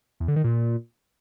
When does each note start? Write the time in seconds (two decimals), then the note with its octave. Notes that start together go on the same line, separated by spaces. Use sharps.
0.20 E2
0.28 D3
0.36 D#3
0.44 A#2